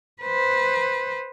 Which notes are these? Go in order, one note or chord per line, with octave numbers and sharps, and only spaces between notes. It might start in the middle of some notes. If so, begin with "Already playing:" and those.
B4 C5